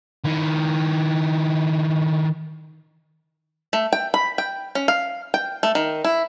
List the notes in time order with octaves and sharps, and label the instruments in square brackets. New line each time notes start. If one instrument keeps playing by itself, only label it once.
[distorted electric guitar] D#3 E4
[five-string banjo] A3
G5
B5
G5
C#4
F5
G5
A3
D#3
E4